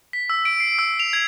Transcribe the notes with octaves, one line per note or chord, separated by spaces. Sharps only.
B6
E6
D7
C7
E6
F7
G#6